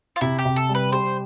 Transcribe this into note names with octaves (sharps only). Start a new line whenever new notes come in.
F4
C3 E4
G4
C3
A4
G3
B4
G4 C5